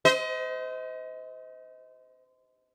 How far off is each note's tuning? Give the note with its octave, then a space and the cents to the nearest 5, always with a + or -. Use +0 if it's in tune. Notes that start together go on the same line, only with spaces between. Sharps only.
C5 -30 D#5 +30